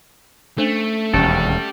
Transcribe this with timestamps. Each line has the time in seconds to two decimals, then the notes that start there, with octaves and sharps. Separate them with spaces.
0.58 A3 C#4 D4 C5
1.14 E1 D#2 A3 C#4 F#4 G4 A4 D5